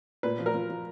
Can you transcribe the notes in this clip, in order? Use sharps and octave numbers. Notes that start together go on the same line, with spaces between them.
A#2 B4
F3
A#4
F3
F3